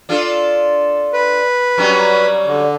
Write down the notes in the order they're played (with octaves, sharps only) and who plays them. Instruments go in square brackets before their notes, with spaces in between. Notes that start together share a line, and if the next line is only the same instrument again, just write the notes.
[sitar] D4 F4 A4
[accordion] B4
[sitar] F#3 G3 C#4
[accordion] D3